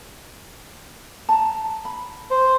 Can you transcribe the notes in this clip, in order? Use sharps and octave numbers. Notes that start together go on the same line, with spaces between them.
A5 A#5
B5
C5